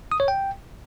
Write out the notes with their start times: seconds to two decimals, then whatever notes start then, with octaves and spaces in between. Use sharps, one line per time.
0.12 D#6
0.20 C#5
0.28 G5